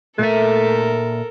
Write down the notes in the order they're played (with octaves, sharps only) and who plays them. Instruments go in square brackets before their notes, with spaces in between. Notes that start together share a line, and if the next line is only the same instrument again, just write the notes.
[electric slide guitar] A#2 E5 [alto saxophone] A3 [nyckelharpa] A4 A#4